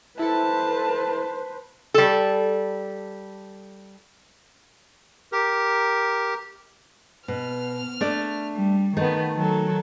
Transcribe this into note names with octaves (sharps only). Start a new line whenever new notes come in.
E4 A4 B4 C5 A5
G3 A4
G4 A#4
B2 F6
A3 D4 D5
G3
D#3 A3 B3 D#4
D#3 F#3 A4